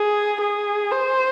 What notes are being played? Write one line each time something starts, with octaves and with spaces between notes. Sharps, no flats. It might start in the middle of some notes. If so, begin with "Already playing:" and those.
Already playing: G#4
G#4
C5